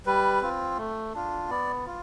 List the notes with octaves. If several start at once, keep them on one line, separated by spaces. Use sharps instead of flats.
G3 B4
C4 F4
A3
D4 F4
B3 D5
F4